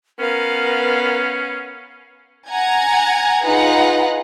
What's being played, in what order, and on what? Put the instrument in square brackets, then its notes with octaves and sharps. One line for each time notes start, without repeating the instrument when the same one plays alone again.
[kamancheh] B3 F5 [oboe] C#4 [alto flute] A#4
[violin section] F#5 G#5 A#5 G#6
D#4 F4 G#4 B4 F#5 A#5